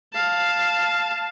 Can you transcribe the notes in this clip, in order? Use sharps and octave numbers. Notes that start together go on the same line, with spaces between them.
F5 A5